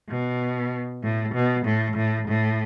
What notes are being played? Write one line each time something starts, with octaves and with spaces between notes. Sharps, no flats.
B2
A2
B2
A2
A2
A2